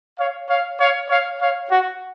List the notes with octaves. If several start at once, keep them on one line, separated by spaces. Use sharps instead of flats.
C#5 F5
C#5 F5
C#5 F5
C#5 F5
C#5 F5
F#4